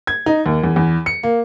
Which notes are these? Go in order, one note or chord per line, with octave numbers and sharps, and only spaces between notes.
G#6
D#4
D#2
E2
E2
C#7
A#3